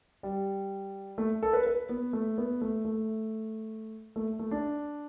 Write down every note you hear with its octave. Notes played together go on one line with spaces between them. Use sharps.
G3
A3
A4
B4
B4
B3
A3
B3
A3
A3
A3
A3
D4